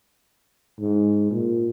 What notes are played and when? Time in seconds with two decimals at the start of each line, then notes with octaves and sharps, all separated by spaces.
0.80 G#2
1.31 A#2